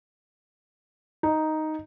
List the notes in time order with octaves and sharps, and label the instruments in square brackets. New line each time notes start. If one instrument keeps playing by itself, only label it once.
[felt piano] D#4